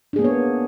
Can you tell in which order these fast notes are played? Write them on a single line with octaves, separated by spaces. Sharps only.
D4 G#4 A#3 B3 C#5